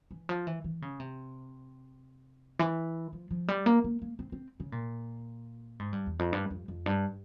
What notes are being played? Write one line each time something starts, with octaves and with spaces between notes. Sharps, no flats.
E3
F3
E3
E3
C#3
C3
E3
F3
F3
G3
A#3
A#3
A#3
C4
C4
C#3
A#2
G#2
G2
E2
F2
G2
F2
F2
G2